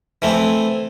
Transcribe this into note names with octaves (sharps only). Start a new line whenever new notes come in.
E3 A3 C4